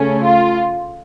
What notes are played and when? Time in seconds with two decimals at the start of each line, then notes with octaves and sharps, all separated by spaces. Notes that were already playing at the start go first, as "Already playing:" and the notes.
Already playing: C#3 A3 C#4
0.24 F4